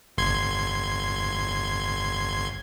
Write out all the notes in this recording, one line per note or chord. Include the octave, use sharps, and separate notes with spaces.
G1 C6 G#6